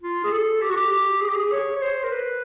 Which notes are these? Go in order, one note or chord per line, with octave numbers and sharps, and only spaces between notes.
F4
G#4
A4
G4
F#4
G4
G4
G#4
G4
G#4
C#5
C#5
C5
A#4
B4